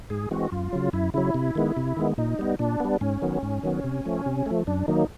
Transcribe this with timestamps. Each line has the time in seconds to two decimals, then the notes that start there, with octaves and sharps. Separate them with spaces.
0.10 G#2 G#4
0.31 E3 G#3 C4 F#4
0.52 F#2 F4
0.73 C#3 F#3
0.93 F#2 E4
1.14 C#3 F#3 E4
1.34 C3
1.55 D#3 G#3 B3
1.77 C3
1.97 D#3 G#3 B3
2.18 A#2 D#4
2.39 G3 B3
2.59 A#2 D4
2.80 G3 B3
3.01 G#2 C#4
3.22 D#3 F#3 B3
3.43 G#2
3.63 D#3 F#3 B3
3.84 C3
4.05 F3 A3
4.26 C3
4.46 F3 A3
4.67 F#2 D4
4.88 D#3 F#3 A#3 D#4